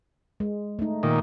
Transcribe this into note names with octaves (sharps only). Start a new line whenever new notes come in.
G#3
A3 D#4
A#2 D#3